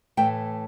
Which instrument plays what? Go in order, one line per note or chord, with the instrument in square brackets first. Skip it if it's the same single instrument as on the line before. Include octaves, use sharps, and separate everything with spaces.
[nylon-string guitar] A2 E3 A3 G5